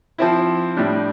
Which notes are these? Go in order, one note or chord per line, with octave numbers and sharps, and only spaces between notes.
F3 C4 E4
A2 G3 D4